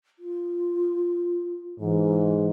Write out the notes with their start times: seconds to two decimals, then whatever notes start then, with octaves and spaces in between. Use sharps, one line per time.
0.19 F4
1.80 G#2 E3